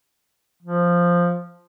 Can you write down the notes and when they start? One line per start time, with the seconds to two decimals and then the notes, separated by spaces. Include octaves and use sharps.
0.63 F3